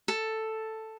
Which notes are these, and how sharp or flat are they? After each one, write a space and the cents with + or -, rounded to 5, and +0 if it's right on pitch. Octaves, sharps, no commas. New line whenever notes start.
A4 +5